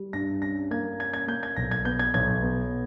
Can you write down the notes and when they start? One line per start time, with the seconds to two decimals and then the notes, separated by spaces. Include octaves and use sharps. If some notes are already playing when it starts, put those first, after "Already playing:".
Already playing: G3
0.13 G2 A#6
0.42 C#4 A#6
0.71 A#3 G#6
0.99 C#4 G#6
1.13 G#6
1.27 A#3 G6
1.43 G#6
1.56 B1 A#6
1.71 G#6
1.85 B3 G6
1.99 G#6
2.14 B1 G#6
2.42 B3